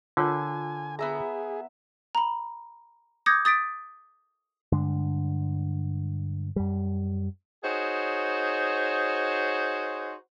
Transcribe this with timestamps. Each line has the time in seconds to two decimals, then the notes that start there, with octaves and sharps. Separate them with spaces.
0.17 D3 F4 A#4 C#5 G#5
0.99 B3 G#4 E5 A#5
2.15 A#5 B5
3.26 D6 D#6 G6 G#6 A#6 C#7
3.45 D#6 A6 B6 D7
4.72 G2 D3 G#3 D4
6.56 F#2 G3
7.63 D#4 F#4 G#4 C5 C#5